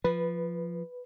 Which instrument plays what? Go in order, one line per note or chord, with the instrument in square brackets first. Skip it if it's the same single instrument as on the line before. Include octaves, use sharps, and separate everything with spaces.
[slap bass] F3 [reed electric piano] B4